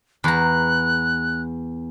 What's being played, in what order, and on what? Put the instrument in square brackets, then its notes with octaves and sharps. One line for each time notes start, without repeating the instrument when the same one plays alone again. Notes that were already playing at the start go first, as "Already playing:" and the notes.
[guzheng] E2 A#5 [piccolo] F#6